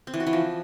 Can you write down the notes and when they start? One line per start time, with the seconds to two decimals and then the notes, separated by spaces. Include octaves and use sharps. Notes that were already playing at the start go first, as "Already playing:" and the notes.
0.07 C4
0.14 E3
0.20 F#4
0.26 E3
0.33 F3